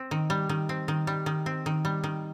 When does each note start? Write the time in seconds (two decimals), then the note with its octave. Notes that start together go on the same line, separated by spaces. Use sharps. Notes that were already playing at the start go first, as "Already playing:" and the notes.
Already playing: C4
0.11 D#3
0.30 G3
0.49 D#3
0.69 C4
0.88 D#3
1.07 G3
1.26 D#3
1.46 C4
1.66 D#3
1.85 G3
2.04 D#3